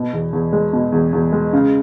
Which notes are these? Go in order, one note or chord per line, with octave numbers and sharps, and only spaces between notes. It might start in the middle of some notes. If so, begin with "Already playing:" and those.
Already playing: B2
E2
E2
G#3
B2
E2
E2
G#3
C#3